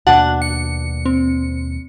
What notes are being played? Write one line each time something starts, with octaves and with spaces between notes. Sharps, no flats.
D#2 B2 A#3 D4 F#4 F#5
C#7
C4